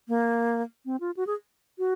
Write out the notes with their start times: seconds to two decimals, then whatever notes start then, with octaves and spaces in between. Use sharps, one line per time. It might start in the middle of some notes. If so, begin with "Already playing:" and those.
0.08 A#3
0.85 C4
1.00 F4
1.17 F#4
1.27 G#4
1.79 F#4